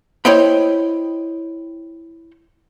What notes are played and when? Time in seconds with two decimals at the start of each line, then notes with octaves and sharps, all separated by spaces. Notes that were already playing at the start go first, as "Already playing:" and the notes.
0.25 E4 C5 C#5 D#5 G5 B5